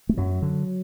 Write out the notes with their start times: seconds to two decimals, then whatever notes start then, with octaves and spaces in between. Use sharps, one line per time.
0.09 A3
0.17 F#2 F#3
0.42 D3